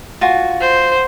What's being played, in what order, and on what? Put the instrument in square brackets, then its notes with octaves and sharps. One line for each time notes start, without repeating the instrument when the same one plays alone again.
[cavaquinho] F4 F#4 G#5
[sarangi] C5